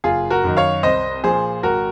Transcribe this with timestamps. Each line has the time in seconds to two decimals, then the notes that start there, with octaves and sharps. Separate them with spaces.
0.04 F#1 F4 G#4
0.30 F#4 A#4
0.44 F#2 D#3
0.57 C#5 F5
0.83 C2 C5 D#5
1.24 A#2 F3 G#4 C5
1.63 G#1 F#4 A#4